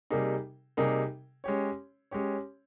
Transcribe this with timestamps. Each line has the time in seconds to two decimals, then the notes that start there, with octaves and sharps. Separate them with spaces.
0.10 C3 G3 A#3 D#4 G#4
0.77 C3 G3 A#3 D#4 G#4
1.44 G#3 C#4 G4 C#5
2.11 G#3 C#4 G4 C#5